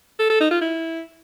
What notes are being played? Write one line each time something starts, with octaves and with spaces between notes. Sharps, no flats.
A4
A4
D#4
F4
E4